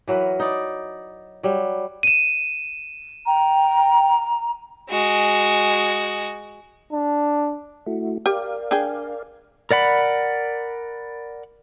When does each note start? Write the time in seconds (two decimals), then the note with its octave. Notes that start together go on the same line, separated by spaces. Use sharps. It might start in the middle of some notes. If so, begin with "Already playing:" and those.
0.08 E3 F#3 A#4 B4
0.40 D#4 D5
1.43 F#3 G3
2.03 D#7 E7
3.26 G5 A#5
4.90 G#3 F#4
6.92 D4
7.86 A3 E4 F#4
8.26 G4 A#4 D5 F5
8.71 D4 G#4 G5
9.71 A#4 D5 F#5 B5